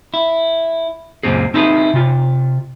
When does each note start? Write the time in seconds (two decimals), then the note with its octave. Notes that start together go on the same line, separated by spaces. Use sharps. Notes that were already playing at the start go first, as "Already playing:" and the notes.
0.14 E4
1.23 C#2 F#2 A#2 C4 G#4
1.54 C4 D#4 E4 G#4 A#4 B4
1.94 C3 F4